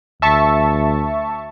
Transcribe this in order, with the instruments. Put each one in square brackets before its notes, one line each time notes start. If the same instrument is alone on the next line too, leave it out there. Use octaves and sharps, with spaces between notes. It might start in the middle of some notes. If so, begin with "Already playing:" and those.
[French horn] D2 [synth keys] E5 A5 C#6